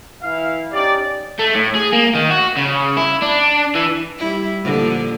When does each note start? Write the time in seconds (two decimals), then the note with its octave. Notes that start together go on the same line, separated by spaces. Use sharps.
0.22 E3 E4 F5
0.72 C#4 D#4 G4 D5
1.39 A3
1.55 A2
1.75 G#4
1.93 A#3
2.15 D#3
2.30 F#4
2.57 C#3
2.97 E4
3.22 D4
3.75 E3
4.18 G3 E4
4.62 A#2 D3 F3